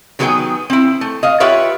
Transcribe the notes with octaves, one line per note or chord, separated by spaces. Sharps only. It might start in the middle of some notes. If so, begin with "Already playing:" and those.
D#3 F#3 B3 G#4 B4 G5
C4 E4
A3
D#5 F5
F4 G4 B4 C#5 E5 F#5